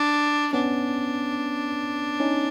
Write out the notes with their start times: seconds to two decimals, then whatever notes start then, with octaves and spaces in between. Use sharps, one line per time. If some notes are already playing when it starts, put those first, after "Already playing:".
Already playing: D4
0.53 B3 C#4 D4
2.20 C#4 D#4